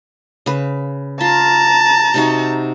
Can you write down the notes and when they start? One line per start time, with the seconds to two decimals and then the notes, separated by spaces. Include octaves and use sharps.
0.46 C#3 B4
1.21 F4 A5 A#5
2.14 C3 D#4 F#4